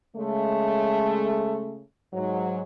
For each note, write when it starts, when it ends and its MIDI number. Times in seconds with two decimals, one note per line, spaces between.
0.16 1.81 49
0.16 1.81 56
0.16 1.81 57
2.14 2.62 44
2.14 2.62 54